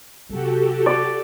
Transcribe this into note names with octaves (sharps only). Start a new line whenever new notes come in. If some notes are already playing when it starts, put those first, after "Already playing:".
C3 F#3 F#4 G4 A4
D5